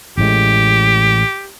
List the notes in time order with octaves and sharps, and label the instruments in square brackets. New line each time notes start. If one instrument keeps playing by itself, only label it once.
[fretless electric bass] A1 A2 G#3 [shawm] G4